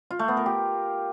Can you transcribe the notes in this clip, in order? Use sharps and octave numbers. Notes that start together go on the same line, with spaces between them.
F4
A3
B3
A#4
G4